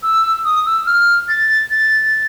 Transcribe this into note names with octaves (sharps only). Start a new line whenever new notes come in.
E6
D#6
E6
F6
A6
A6